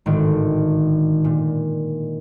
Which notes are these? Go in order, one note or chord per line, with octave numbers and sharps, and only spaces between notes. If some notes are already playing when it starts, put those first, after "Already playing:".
G#1 A2 D3 D#3
A#2